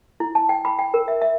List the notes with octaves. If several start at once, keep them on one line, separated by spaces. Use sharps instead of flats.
E4
A5
G5
B5
G5
A#4
E5
E5